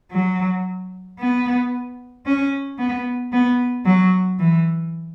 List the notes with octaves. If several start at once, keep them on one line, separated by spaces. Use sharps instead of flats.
F#3
B3
C#4
B3
B3
F#3
E3